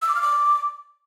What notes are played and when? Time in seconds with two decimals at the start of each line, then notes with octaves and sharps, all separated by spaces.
0.02 E6
0.09 D6
0.15 F6
0.22 D6